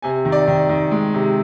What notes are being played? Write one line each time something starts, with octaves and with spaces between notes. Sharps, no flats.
C3 G#5
D#3
D5
D#3
D#3
G#3
C3